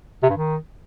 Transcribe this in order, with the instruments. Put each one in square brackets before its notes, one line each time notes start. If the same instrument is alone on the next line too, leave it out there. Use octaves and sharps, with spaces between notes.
[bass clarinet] C3
G2
D#3